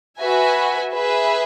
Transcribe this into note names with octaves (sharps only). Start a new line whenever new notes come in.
F#4 B4 E5 G#5
G#4 B4 E5